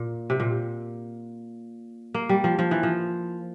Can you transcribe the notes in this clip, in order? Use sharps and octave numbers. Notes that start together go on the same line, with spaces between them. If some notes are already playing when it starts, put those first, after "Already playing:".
Already playing: A#2
C3
A#2
A#3
G3
F3
F3
E3
F3